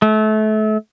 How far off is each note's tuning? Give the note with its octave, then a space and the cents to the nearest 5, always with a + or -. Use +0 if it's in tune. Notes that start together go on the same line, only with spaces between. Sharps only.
A3 -30